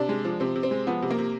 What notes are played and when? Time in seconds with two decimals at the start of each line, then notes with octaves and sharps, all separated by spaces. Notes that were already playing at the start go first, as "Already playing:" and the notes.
Already playing: C3 D4
0.09 G#3
0.25 F3
0.40 C3 C4
0.56 C3
0.63 C4
0.71 G#3
0.87 F3 B3
1.02 C3
1.11 A#3
1.18 C3